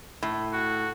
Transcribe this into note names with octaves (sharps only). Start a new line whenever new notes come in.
A2
F#4